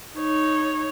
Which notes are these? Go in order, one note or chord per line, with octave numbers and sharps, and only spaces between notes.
D#4 C#5